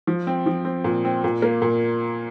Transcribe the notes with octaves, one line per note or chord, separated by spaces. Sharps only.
F3
C4
F3
C4
A#2
C4
A#2
A#3
A#2